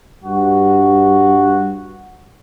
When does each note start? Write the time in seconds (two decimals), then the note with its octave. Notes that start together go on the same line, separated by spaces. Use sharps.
0.24 G2 F#4